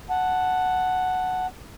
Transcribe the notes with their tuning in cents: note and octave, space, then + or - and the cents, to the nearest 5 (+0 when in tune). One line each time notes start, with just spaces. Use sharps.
F#5 +0 A5 +0